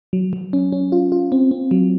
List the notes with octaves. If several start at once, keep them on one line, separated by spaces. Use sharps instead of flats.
F#3
F#3
C#4
C#4
F4
F4
C4
C4
F#3